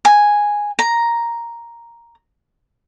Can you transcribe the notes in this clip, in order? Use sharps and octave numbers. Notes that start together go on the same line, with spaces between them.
G#5
A#5